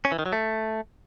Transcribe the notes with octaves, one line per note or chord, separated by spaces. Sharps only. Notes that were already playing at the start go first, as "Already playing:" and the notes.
C#4
E3
D#3
F#3
A3